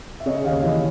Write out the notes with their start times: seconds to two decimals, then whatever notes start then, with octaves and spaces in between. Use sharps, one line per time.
0.20 E5
0.26 C#3 C#5 D#5
0.44 D#2 D#5 F5
0.63 E3 C#5 D#5